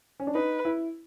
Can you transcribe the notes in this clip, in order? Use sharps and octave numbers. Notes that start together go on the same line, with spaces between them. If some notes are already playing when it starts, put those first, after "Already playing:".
C#4
D4
D#4 B4
E4